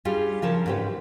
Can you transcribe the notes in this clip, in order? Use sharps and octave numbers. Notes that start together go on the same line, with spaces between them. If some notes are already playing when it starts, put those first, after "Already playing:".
G3 C#4 D4 F4 G4 G#4
C#3 F3 C#4 A4 A#4 A5
G#2 E3 C#4 G4 B4